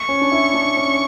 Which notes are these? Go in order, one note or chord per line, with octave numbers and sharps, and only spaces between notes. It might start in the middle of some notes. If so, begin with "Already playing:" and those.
Already playing: C#6
C#4
D4
E4
D4
C#4